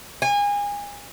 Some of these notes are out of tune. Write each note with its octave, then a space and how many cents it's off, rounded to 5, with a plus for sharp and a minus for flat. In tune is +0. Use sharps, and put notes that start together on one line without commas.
G#5 -30